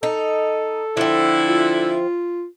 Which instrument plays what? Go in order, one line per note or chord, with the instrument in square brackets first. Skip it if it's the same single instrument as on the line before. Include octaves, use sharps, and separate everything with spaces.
[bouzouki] D#4 [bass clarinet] A4
[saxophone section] D3 E4 [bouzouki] F3 C4
[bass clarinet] F4